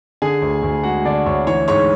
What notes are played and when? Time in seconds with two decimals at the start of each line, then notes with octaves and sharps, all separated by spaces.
0.22 D3 G#4 G#5
0.42 D2
0.63 D2
0.84 G#3 F#4 F#5
1.05 D3 D4 D5
1.26 D2 C#5 C#6
1.47 E3 C#5 C#6
1.68 G#2 C#5 C#6